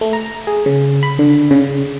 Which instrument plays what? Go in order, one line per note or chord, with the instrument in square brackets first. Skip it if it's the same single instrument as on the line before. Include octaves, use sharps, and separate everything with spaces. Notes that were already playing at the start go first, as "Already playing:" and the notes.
[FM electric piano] A3
A#5
G#4
C#3
B5
D3
C#3